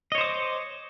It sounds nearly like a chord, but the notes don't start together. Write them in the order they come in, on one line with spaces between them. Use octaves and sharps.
D#5 C#5 C5 D#6 D6